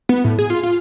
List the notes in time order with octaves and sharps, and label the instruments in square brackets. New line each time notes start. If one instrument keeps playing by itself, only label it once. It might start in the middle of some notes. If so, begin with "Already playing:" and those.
[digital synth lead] B3
A2
G#4
F4
F4